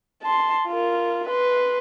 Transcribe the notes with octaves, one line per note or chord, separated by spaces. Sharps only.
A5 C6
F4 A#4
B4 C6